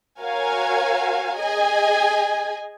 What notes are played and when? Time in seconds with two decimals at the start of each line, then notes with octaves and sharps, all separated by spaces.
0.21 F#4 A#4 C#5 F5 G#5
1.37 G#4 D#5 G#5